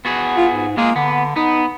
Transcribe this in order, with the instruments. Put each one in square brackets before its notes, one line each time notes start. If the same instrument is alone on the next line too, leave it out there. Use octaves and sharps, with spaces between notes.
[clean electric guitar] B3 F#4 G#4
[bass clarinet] F4
G#2
[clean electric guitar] G#3 F4 G#4 [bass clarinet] A#3
[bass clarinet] D3 [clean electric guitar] B3
[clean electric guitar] B3 [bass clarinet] D#4